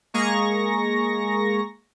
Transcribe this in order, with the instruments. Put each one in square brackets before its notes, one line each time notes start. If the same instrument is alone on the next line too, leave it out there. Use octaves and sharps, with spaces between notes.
[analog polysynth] G#3 A#3 G#4 A#5 C#6 A#6